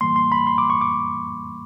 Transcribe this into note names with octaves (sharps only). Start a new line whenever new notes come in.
A2 E3 G3 A#3 C6
C6
B5
C6
D6
C#6
D6